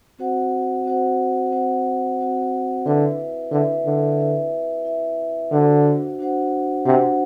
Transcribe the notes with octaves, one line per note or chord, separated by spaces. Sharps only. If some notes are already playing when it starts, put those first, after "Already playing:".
C4 F#4 C5 F#5
C4 F#4 C5 F#5
C4 F#4 C5 F#5
C4 F#4 C5 F#5
D3 E4 B4 E5
D3 E4 B4 E5
D3
E4 B4 E5
E4 B4 E5
D3 D4 F#4 C5 F#5
D4 F#4 C5 F#5
C3 D4 F#4 C5 F#5